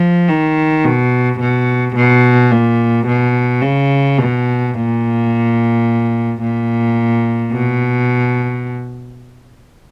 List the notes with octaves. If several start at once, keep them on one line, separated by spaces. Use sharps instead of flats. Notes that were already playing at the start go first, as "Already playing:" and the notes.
Already playing: F3
D#3
B2
B2
B2
A#2
B2
C#3
B2
A#2
A#2
B2